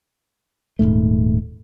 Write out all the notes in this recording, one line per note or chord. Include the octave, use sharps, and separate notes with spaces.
D#1 F2 G#2 A3